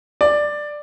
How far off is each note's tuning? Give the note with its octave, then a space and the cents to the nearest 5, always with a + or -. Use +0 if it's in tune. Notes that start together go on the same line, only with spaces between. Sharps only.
D5 +10